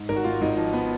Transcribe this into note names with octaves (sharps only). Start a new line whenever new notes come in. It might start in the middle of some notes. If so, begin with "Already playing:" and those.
Already playing: G#2
G#1 A#4
F#4
G#2 F4
G#1 D#4
F3
B3